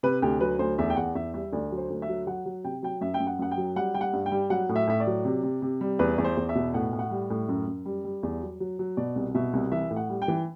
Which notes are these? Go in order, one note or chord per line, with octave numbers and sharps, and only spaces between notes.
C3 B4
D2 G4
F#3 B4
D2 C5
E2 E5
G5
E2 F#5
E2 E5
G3 E5
D2 D5
F#3
C5
D2
E5
F#3
F#3 F#5
F#3
C3 G5
F#3 G5
F#2 E5
G5
F#2
F#5
F#2 F#5
G5
F#3
G3 F#5
G3 G5
F#5
G2
G5
G3
F#3 F#5
A2
E5
A2 E5
D5
F#3
C3
C3
C3
G3
E2 B4
E2
C5
E2
E5
B2
A2 F#5
A2
F#5
G3
A2
F#2
F#2
G3
G3
E2
F#3
F#3
F#3
B2 D5
C2
B2 E5
C2
E3 E5
A2
F#5
G3
G5
E3